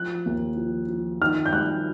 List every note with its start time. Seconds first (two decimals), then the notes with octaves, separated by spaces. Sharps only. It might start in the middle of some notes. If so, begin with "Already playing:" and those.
Already playing: F3 F#6
0.26 D#2
0.57 F3
0.88 F3
1.21 D#3 F6
1.46 G6
1.52 G3 F#6